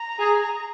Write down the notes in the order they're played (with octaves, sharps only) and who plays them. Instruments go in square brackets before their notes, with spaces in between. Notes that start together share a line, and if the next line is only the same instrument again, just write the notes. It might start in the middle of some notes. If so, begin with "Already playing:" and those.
Already playing: [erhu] A#5
[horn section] G#4